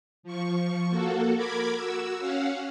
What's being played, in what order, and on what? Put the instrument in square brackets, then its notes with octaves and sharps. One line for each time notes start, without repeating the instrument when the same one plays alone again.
[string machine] F3 C#6
A#3 F#4 A4
A#4 B5 D6 G#6
F#4 E6
C#4 F5 F#5